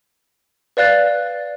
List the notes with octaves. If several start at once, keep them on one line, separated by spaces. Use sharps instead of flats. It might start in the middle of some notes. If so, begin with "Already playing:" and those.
B4 D5 F5 F#6 A6